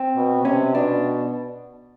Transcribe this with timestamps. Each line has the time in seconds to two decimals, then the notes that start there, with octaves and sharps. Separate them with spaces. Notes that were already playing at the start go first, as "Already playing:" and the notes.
Already playing: C4
0.16 B2
0.45 C3 C#4
0.74 B2 D4